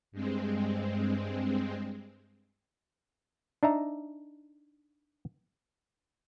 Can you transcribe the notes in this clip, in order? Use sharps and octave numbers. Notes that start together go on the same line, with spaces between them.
G2 G#3 C4
D4 D#4 E5 A#5